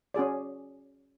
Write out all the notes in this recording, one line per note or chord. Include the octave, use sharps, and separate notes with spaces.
C#4 F#4 G#4 D5